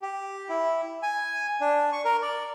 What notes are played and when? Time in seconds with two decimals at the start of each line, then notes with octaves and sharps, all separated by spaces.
0.02 G4
0.49 E4
1.03 G#5
1.61 D4
1.93 C#6
2.05 A#4
2.22 D5